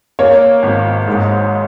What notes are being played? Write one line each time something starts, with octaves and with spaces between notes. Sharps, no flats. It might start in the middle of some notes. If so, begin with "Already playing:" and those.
A#3 C#5
G#1
G#2